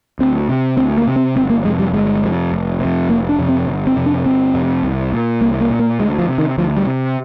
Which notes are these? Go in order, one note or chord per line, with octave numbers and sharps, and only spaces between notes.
D2 C4
C3
D2 C4
A#3
C3
C4
G1 C4
A#3
F2 C3 G#3
G3
G1 G#3
F2 C3
F1
F2 C3
F1 A#3
D4
F2 C3
C4
G1
C4
F2 C3
D4
G1 C4
F2 C3
C2
A#2
C2 A#3
A#3
A#2
A#3
D2 G#3
F3
C3
D#3
D2 F3
G3
C3